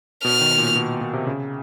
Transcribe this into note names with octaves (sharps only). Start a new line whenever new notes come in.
B2 F6
D#3
A#2
B2
B2
C3
C#3